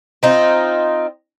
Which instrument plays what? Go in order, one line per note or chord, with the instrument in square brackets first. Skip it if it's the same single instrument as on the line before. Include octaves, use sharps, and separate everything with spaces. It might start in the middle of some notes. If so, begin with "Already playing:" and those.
[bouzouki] C4 D#4 F4